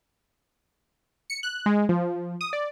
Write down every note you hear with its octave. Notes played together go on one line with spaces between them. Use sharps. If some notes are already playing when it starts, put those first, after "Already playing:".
C#7
F#6
G#3
F3
D#6
D5